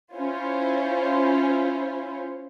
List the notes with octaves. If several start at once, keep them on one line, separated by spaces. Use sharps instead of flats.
C#4 E4 F4 C5 C#5